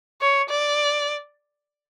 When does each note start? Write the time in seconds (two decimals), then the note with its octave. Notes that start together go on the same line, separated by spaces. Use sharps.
0.22 C#5
0.50 D5